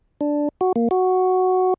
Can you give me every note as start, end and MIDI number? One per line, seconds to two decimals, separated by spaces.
0.21 0.49 62
0.61 0.73 66
0.76 0.88 58
0.91 1.74 66